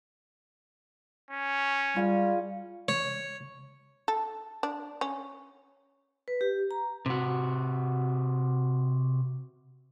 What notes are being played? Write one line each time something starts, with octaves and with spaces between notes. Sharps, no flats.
C#4
G3 F4 G#4
C#5
A4
D4
C#4
B4
G4
A#5
C3 F#4